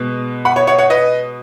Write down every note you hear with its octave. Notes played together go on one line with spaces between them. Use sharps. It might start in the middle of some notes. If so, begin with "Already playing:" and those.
Already playing: B2 G#3 B3
F#5 B5
C#5
C#5 F#5
C#5 F#5
B4 D#5